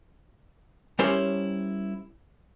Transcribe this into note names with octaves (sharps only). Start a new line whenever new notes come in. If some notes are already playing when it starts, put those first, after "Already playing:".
G3 C#4 E4 A#4 C5 C#5